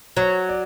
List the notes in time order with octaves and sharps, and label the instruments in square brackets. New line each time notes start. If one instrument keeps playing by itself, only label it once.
[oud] F#3 [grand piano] C#5
[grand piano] D5